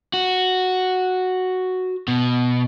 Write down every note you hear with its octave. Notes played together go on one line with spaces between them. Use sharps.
F#4
B2